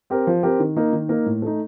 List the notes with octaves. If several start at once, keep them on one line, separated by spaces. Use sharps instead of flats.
C4 G4 A#4
F3
C4 G4 A#4
D#3
A#3 D#4 A#4
D#3
A#3 D#4 A#4
A2
A3 D#4